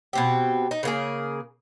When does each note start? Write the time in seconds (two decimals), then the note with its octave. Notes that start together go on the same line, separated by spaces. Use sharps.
0.13 B2 C4 G4
0.71 D#4
0.83 C#3 A#3 G#4